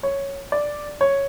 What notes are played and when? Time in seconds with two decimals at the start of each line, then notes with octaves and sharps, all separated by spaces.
0.03 C#5
0.52 D5
1.01 C#5